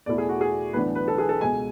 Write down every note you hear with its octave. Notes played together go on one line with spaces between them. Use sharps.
E2 B2 A3 E4 D5
G#4
F#4
G#4
B1 A2 E3 B3 D4 B4
B4
A4
G#4
A4
C#2 B2 G#3 G#5